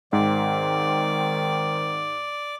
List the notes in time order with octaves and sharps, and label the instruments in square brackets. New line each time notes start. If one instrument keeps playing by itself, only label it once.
[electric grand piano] G#2 [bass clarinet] D#3 [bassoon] C4 [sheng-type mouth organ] D5